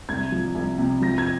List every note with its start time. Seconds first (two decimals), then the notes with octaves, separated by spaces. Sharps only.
0.09 C2 G#6
0.32 F3
0.55 C2
0.78 C3
1.02 F3 A#6
1.18 G#6